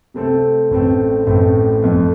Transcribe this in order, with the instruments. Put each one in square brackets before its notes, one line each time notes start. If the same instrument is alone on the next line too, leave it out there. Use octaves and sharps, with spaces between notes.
[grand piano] C3 A3 C4 A4
A1 A2 A3 C4
A1 A2 A3 C4
F2 F3 A3